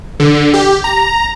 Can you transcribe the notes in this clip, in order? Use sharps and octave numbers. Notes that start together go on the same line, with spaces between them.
D3
G4
A#5